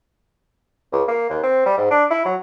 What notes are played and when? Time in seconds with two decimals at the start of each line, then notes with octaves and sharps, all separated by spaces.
0.92 C#2
1.08 A#3
1.30 D#2
1.43 C4
1.66 G3
1.77 G#2
1.91 D4
2.10 E4
2.25 F#3